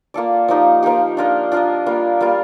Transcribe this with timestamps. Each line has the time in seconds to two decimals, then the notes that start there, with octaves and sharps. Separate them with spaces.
0.14 A#3 F4 A4 D5
0.48 F3 A#3 D#4 G4
0.83 F3 A#3 D#4 G4
1.17 D4 F4 A#4 D#5
1.52 D4 F4 A#4 D#5
1.86 G3 A#3 F4
2.21 G3 A#3 F4